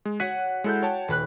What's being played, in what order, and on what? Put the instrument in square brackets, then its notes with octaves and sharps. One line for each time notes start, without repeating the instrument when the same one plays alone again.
[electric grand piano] G#3
[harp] F#4 C#5 F#5 [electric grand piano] F#6 B6 D#7
[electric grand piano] G#3 E4 A4 [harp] F#5 G6
[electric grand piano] C#5 A5 [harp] G5
[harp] D#1 B4 F#6